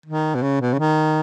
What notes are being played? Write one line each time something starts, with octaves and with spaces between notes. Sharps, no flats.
D#3
B2
C#3
B2
C#3
D#3